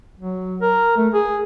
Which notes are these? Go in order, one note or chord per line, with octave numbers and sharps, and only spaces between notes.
F#3
A#4
A3
G#4